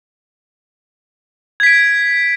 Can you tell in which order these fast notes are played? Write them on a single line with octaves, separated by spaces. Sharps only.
G#6 B6 D7